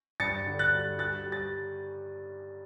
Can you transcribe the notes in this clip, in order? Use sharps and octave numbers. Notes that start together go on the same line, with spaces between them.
G2 A6 C#7
D3
F#6 A6
G3
G3 F#6 A6
G3
A6